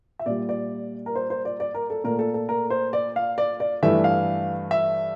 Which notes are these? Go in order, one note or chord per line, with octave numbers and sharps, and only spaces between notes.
E5
A#2 G3 D5
D5
A#4
C5
C5
D5
D5
A#4
A4
A#2 A3 A#4
A4
A4
A#4
C5
D5
F5
D5
D5
G2 E3 A3 E5
F5
E5